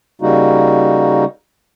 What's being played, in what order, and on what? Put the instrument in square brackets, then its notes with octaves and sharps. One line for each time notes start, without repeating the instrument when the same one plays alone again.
[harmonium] C#3 G3 A#3 D#4 F#4